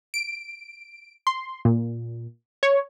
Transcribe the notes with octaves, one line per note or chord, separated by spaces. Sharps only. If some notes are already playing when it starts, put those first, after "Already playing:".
D7
C6
A#2
C#5